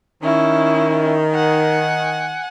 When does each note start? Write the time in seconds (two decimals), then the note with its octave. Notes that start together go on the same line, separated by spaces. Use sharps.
0.23 D#3 C#4 E4
1.34 F#5 G#5